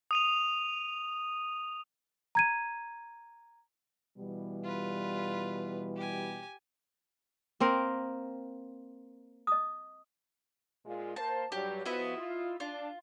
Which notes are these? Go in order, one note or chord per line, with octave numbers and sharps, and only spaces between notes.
D#6 D#7 F7
A#5 G#6 D#7
B2 E3 G3
F4 B4
G4 G#5
A#3 C4 A#4
D#5 D#6
A#2 G#3 F4
A#3 C5 A5
G2 F#3 G3 G4
F3 B3 E4 F#4 D#5 E5
F4
D4 F4